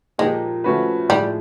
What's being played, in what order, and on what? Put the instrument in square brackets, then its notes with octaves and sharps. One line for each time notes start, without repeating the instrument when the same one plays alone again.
[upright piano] A#2 F3 A#3 D#4 G4 [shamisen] G#3
[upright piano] F3 A3 C#4 F#4 B4
[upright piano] A2 F3 G#3 [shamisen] G3